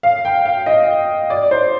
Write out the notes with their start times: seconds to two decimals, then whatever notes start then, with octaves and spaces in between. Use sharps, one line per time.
0.03 F5
0.25 G5
0.46 F5
0.66 D#5
1.30 D5
1.51 C5